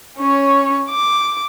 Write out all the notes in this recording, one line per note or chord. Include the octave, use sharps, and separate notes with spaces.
C#4 C#5
D6